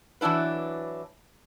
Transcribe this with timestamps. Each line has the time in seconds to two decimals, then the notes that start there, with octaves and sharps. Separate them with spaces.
0.21 E3 F#3 D4 E4 B4